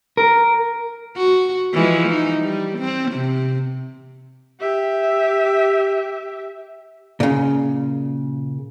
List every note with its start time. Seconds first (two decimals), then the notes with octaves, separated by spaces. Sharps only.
0.17 A#4
1.16 F#4
1.73 E3 F3 G#3
2.08 D#4
2.41 G3
2.78 C4
3.11 C3
4.60 G4 E5
7.20 A#2 C#3